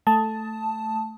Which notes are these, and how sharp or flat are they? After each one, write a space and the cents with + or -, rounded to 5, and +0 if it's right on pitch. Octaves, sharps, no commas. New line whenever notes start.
A3 +0 A5 +0 D#6 +20